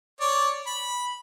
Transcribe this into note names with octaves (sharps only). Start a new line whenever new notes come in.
C#5 D5
B5